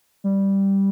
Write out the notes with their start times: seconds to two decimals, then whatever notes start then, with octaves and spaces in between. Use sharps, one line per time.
0.24 G3